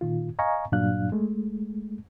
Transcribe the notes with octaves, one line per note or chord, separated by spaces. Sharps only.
A#2 D#3 F4
D#5 F5 G#5 A#5 C#6
G2 A#2 F#3 D4 F5 F#6
G#3 A3